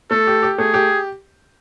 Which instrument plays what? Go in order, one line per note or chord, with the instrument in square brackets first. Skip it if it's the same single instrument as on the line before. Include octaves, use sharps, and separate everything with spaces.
[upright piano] A3 [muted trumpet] A4
[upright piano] G4
G4
[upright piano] A3 [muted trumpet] G#4
[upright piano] G4